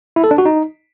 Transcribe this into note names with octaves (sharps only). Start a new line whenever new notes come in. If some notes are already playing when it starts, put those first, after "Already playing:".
E4
A4
D4
F#4
D#4